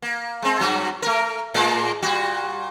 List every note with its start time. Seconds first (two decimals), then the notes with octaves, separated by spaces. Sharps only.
0.02 A#3
0.42 G#3 C4
0.59 G2 F#3 F#4
1.02 A3 A#4
1.54 A2 G#3 D5
2.02 A#2 G3 F#4